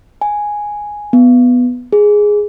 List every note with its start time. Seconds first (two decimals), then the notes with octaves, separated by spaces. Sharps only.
0.21 G#5
1.13 B3
1.93 G#4